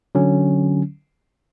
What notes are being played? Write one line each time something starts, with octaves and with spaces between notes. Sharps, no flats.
D3 F#3 C#4